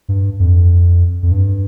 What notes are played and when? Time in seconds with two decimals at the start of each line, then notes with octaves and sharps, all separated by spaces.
0.09 G2
0.40 F2
1.23 F2
1.31 G2